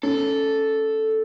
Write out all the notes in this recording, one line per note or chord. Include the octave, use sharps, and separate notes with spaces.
C#4 A4